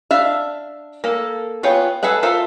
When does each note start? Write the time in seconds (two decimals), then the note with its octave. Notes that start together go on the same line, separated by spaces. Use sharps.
0.11 D4 E5 F5
1.04 A#3 A4
1.63 B3 F4 G#4 C#5 G5
2.03 G#4 A4 B4 E5 F#5
2.23 F4 A4 A#4 C5 E5